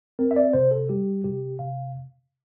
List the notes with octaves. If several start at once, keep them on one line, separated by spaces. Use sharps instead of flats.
C4 A#4
E5
D5
C3 C5
A4
G3 G4
C3 G4
C3 F5